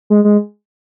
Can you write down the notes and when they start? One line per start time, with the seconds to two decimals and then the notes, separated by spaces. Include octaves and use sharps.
0.10 G#3
0.24 G#3